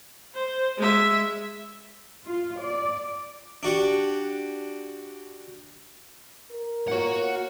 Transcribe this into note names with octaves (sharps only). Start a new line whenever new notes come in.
C5
G#3 E5
F4
D5
D4 F#4 G4
A#4
A#3 F4 F#4 C#5 F#5